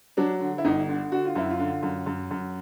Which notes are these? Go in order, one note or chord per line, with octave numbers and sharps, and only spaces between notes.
F#3 D4
D3
E4
G1 D#4
D3
D3 F#4
F4
F#2 E4
F4
D3
F#2
F#2
F#2